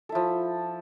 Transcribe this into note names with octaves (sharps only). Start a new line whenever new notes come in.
F3 E4 A4